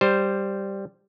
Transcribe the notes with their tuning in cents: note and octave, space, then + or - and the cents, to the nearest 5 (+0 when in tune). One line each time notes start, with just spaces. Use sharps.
G3 +0 C5 +0